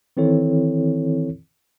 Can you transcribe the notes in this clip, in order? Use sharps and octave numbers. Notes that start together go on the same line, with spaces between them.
D#3 E3 C4 E4 A4 C#5